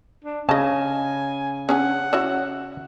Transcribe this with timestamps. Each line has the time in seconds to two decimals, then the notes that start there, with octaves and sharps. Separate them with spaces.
0.24 D4
0.49 C#3 D#5 G#5 A5
1.69 C#4 D4 G#4 F#5
2.13 C#4 E4 F#4